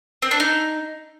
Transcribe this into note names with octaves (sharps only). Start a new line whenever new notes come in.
C4
D4
D#4